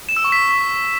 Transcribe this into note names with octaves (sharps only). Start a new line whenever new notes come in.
E7
E6
C#6
B6